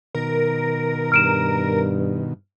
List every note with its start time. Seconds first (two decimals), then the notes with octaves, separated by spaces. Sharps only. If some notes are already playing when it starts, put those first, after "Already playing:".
0.15 B2 D#3 A#4
1.12 G2 F6 D7 E7